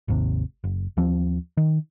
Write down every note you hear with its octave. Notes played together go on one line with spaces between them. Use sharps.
G#1 D#2 C3
F#1
D#2 F3 C4
D#3